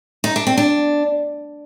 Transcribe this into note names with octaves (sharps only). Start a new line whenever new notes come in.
D#4
D4
C4
D4